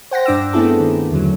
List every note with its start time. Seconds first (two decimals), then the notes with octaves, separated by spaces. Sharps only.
0.11 C5 F#5 G5 A#6
0.25 G2 D4 D6 E6
0.53 A3 B3 C4 E4 G#4 A4
0.80 D#3
1.11 E2 D3 F#3